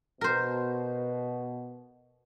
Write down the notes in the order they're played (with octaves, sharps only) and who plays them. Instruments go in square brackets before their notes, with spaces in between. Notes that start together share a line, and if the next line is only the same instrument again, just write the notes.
[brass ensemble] B2 [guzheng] A#4 C5